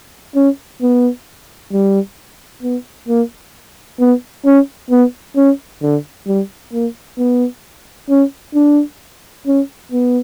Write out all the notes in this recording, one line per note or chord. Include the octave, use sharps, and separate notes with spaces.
C#4
B3
G3
B3
A#3
B3
C#4
B3
C#4
D3
G3
A#3
B3
C#4
D4
C#4
B3